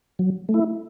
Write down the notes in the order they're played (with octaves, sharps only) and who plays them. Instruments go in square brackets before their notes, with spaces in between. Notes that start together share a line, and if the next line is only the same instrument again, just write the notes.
[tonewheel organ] F#3
A3
E4